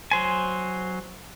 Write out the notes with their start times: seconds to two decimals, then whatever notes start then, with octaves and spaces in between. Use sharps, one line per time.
0.11 F#3 C5 G#5